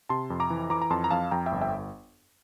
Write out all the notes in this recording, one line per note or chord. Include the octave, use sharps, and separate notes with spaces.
C3 A5 C6
F2
A#5 D6
E3
E3 A#5 D6
A#5
F2 A5 C6
A#5
F2 F5 A5
F2 G5 A#5
E5 G5
G1
E5 G5